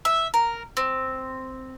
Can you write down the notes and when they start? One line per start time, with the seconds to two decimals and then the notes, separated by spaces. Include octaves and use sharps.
0.05 E5
0.34 A#4
0.77 C4